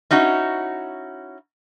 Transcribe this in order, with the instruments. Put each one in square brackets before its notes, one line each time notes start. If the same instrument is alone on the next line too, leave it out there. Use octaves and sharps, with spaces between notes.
[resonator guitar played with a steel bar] C#4 D#4 E4 F#4